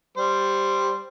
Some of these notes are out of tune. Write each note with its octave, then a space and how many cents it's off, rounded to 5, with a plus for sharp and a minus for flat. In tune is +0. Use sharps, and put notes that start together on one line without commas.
G3 +0 C5 +0